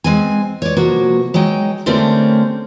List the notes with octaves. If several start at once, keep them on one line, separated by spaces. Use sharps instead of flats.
G#3 C4 G#5
C#5 D5
C3 F3 A#3 F#4
F#3 G#3 D#4 G5
D3 A3 C4 C#4 G4 A#4